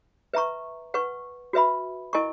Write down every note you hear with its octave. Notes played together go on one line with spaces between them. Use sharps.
B4 E5 A#5 C#6
B4 F#5 C#6
F#4 B4 E5 B5
E4 A#4 D#5 G#5 C#6